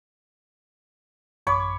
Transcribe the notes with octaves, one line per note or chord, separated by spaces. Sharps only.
A1 F#2 C#5 B5 D6